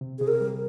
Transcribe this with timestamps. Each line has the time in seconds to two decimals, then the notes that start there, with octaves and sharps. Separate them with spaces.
0.01 C3
0.19 C3 G#4
0.28 A#4
0.41 G3